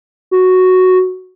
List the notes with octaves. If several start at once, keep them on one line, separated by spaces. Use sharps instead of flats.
F#4